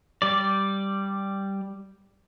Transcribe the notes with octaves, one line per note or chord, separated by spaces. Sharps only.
G3 D5